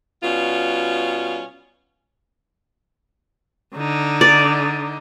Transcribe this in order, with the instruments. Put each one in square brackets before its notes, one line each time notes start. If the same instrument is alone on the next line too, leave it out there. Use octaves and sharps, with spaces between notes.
[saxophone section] B2 G3 C#4 F4
[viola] D3 D#4
[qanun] D5